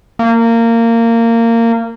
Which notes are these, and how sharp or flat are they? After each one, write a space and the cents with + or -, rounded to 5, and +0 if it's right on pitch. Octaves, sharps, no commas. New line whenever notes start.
A#3 -20